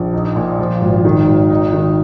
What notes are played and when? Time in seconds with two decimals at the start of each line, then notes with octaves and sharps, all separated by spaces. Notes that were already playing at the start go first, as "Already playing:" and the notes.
Already playing: A#1
0.13 D#4
0.36 A#2
0.59 F3
0.81 G#1
1.05 D#3
1.27 G#1
1.50 D#4
1.73 D#3